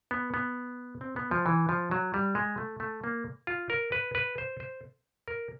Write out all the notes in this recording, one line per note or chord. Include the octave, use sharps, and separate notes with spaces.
B3
B3
C4
B3
F3
E3
F3
F#3
G3
G#3
A3
A3
A#3
F4
A#4
B4
B4
C5
C5
A#4